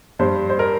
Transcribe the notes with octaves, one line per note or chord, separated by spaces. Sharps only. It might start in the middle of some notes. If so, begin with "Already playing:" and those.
G2 G3 C5
C5
A#4